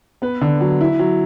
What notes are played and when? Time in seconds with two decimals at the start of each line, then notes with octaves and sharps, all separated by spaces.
0.22 B3 B4
0.41 D3
0.61 F#3
0.81 E4
0.99 F#3